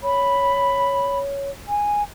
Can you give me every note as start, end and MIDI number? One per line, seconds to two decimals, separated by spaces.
0.03 1.50 73
0.03 1.18 83
1.68 2.02 80